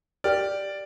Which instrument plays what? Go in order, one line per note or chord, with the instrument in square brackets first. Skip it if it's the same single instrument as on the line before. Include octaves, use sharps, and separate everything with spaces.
[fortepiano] G4 F6 [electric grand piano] D5